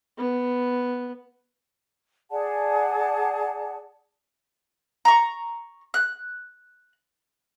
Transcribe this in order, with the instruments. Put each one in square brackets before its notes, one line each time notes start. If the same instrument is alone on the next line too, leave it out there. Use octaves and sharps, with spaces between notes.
[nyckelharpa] B3
[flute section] G#4 D5 F#5 A5
[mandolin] A#5 C#6
F#6